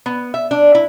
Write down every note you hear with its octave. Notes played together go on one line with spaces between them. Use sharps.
B3
E5
D4
E4